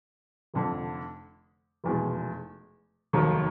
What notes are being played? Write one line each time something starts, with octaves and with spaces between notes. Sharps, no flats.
F1 F2 D3
F1 E2 B2 G#3
F1 D#2 D#3 F#3